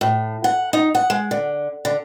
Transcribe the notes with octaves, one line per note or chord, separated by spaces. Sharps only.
A2
F#5
D#4
F#5
G#3
D3
D3